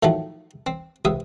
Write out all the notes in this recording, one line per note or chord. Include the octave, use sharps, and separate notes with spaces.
A2 D#3 F3 F#3 A3
C4
C#2 C3 E5 D#6